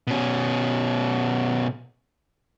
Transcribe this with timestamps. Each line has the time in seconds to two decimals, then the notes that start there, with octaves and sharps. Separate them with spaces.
0.07 B2 C#4